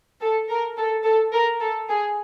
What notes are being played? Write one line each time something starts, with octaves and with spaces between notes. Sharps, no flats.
A4
A#4
A4
A4
A#4
A4
G#4